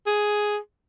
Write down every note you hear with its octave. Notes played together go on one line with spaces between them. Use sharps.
G#4